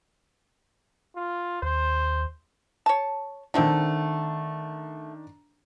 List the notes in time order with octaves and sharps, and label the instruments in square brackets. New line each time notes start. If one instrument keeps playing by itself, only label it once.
[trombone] F4
[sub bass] D#2 [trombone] C5
[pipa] C#5 A5
[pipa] D3 A3 C4 [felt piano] D#3 D4